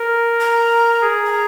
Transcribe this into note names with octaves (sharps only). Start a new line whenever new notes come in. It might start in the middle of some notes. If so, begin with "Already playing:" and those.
Already playing: A#4
A#5
G#4
G#5
A#5